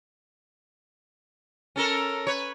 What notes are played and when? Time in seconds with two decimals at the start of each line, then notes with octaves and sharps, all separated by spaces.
1.76 C#4 A4 A#4
2.27 B4 C#5